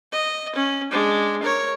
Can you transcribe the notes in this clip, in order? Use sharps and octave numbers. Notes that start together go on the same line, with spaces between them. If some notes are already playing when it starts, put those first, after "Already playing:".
D#5
C#4
G#3 D4
A#4 C#5